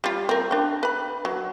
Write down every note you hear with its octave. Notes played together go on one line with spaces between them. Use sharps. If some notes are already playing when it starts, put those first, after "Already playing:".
G3 F4
C4 A#4
D4 G5
B4 B5
F#3